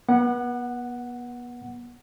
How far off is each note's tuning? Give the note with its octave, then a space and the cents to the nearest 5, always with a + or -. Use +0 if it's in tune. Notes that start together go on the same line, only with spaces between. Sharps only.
B3 -35 F#5 +0